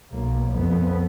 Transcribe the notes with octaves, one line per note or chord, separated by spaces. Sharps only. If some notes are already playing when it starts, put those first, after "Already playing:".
B1 A#3
F2 B3